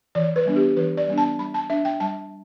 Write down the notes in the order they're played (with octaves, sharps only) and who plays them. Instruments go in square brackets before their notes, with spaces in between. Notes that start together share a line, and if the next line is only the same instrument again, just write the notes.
[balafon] E3 D5
B4
G3 B3 D4
G4
E3 B4
D5
G3 B3 D4
A5
G3 B5
A5
D4 E5
G5
G3 A5